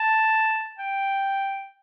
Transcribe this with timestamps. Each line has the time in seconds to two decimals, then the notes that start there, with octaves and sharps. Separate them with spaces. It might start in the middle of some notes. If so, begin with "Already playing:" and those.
Already playing: A5
0.78 G5